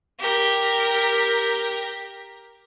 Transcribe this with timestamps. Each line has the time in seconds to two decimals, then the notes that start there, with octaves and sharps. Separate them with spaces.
0.19 G4 A#4